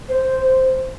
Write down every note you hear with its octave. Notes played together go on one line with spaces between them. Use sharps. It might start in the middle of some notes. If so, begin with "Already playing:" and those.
C5